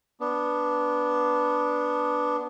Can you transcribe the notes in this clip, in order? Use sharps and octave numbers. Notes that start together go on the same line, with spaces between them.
B3 D4